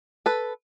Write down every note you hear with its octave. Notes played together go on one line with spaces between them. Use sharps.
A4 B4